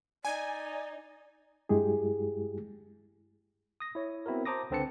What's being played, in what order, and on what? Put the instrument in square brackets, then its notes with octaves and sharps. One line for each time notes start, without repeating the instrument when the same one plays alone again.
[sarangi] D#4 [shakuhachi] D5 [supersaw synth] G#5
[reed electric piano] G2 G#3 E4 G4 G#4
[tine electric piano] D#6 A#6
E4 C#5
B3 C4 E4 F#4 A#4
C5 A5 A#5 D6 D#6 A#6
C#2 D3 C4 B4 A5 C#7